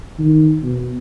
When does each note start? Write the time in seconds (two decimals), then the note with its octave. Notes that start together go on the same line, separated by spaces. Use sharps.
0.19 D#3
0.62 B2